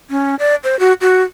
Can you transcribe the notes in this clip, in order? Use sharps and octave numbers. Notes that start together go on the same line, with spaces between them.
C#4
D5
C5
F#4
F#4